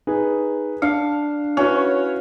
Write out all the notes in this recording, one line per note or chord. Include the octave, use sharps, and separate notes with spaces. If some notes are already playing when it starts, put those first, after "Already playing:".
D#4 G#4 B4
D4 F5 C#7
C#4 E4 F#4 B4
C#5